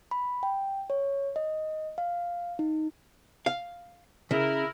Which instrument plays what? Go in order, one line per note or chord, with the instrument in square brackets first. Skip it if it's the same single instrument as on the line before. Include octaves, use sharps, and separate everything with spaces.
[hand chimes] B5
G5
C#5
D#5
F5
D#4
[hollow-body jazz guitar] F5
[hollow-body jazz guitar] C#3 [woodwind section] E4 A#4